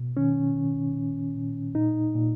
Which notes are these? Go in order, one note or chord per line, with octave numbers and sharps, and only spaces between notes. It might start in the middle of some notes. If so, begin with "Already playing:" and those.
Already playing: B2
D#3 C#4
D#3
A#2
A#2
A#2 D#4
A#2